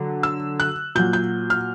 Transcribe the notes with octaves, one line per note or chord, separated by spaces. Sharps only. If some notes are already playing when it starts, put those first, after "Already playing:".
Already playing: D3 F#3
E6
F#6
A#2 F#3 G6
G6
F6